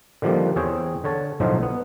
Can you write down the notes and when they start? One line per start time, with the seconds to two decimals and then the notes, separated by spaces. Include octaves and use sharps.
0.22 D3 D#3 F3 G3 A#3
0.56 E2 C4 G#4 C#5 G5
1.04 D3 C#5 A5
1.40 B1 A2 D3 F3 D#4 C5
1.63 B3